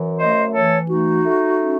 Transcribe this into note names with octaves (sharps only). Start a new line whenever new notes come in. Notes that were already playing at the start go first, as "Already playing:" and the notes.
Already playing: F#2 E3
A3 C5 D#5
E3 A4 C#5
A3 D#4 F#4
A3
C#4